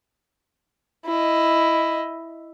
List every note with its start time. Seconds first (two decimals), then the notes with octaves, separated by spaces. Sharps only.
1.05 E4 D#5